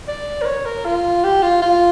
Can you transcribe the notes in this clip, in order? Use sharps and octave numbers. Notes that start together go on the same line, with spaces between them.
D5
A#4
C#5
A#4
F4
G4
F4
F4